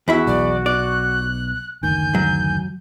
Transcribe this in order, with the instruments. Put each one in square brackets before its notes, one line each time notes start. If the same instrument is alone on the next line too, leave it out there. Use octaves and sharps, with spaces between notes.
[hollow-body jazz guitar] E2 E4 E5 [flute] F#4
[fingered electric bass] B1 [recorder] D5
[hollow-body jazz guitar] D5 [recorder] F#6
[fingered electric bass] F#1 D2 D#3 [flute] G#5 [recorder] G6
[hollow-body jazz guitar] F#3